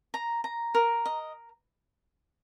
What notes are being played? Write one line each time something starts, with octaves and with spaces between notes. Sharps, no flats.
A#5
A#5
A#4
D#5